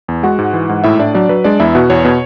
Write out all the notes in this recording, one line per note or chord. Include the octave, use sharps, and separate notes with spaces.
E2
G#3 F#4 F#5
G#2
E3
G#2
A2 E4 E5
A2 D4 D5
F#3 D4 D5
F#3 B4
G#3 D4 D5
E2 E4 E5
B2 F#4 F#5
E2 C#5
B2